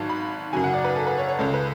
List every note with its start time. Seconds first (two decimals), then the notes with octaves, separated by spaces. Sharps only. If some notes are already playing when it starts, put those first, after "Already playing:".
Already playing: G#1 G#2 F#3 A5
0.09 B5
0.53 F#2 C#3 F#3 G#5
0.64 F#5
0.74 D5
0.84 B4
0.96 A4
1.07 B4
1.18 C#5
1.28 C#5
1.39 C#2 C#3 G#3 A4
1.54 B4